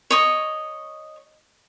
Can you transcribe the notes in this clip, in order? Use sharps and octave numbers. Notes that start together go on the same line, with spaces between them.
C#5 D#5 C#6